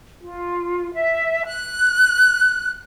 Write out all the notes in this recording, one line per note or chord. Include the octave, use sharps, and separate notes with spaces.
F4
E5
F#6